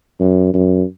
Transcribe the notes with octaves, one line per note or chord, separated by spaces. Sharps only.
F#2
F#2